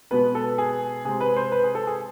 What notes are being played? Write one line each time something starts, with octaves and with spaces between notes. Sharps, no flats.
B2 G#3 B3 B4
A4
G#4
C3 G#3 C4 G#4
B4
C5
B4
G#4
A4
G#4